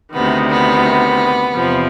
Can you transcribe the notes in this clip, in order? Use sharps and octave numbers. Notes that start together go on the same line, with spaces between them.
D2 C3 D#3 B3
B3
E2 C3 F3